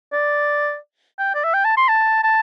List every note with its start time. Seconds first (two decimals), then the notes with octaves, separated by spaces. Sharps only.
0.13 D5
1.19 G5
1.35 D5
1.44 E5
1.54 G5
1.65 A5
1.77 C6
1.89 A5
2.24 A5